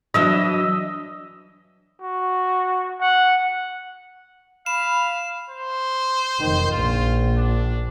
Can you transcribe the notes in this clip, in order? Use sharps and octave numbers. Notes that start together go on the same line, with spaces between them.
E3 F#3 D4 D#5 E5
F#4
F#5
F5 B5 E7
C5
F1 D#3
A#1 F4
D4